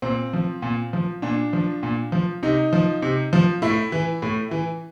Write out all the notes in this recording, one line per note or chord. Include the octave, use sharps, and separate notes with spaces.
A#2 C4
F3
A#2
F3
A#2 D4
F3
A#2
F3
C3 D#4
F3
C3
F3
A2 E4
E3
A2
E3